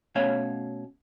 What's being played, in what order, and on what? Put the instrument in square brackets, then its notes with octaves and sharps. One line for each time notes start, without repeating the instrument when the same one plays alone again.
[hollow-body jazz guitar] B2 A3 C#4 C#5 F5